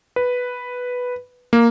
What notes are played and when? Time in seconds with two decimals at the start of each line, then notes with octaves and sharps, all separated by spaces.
0.16 B4
1.53 A#3